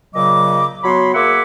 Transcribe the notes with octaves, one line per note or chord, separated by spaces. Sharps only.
A#2 C#3 F#3 D#5 D6
F#3 B3 C#5 B5 C6
A#3 G#4 E5 F#5 D6